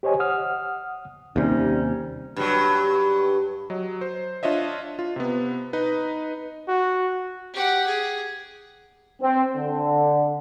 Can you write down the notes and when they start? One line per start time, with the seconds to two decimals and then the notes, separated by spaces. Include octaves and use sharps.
0.03 G4 C5 C#5 D#5 G#5
0.20 F#5 D#6 F6
1.36 D#2 C3 G3 C#4 D#4
2.36 G2 F#3
3.70 F#3 D#5
4.01 C5
4.43 D4 F4 C#5 D#5 E5
4.99 F4
5.16 C3 B3
5.73 D#4 B4 D#5
6.68 F#4
7.54 G4 F#5
7.87 G#4
9.22 C4
9.55 D3